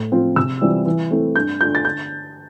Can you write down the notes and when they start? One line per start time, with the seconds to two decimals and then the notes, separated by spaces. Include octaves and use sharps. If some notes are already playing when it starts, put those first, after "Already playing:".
Already playing: A2
0.12 F3 C4 F4
0.36 C3 E6
0.61 E3 G3 C4 F4
0.86 E3
1.11 A3 C4 E4
1.36 G2 G6
1.60 D3 A3 D4 F4 G6
1.75 A6
1.85 D3 G6